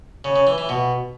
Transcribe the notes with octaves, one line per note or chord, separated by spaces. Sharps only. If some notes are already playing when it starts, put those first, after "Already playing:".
C#3
C#3
E3
E3
B2